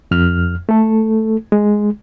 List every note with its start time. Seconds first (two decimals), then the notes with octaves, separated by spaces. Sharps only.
0.11 F2 F6
0.69 A3 A4
1.52 G#3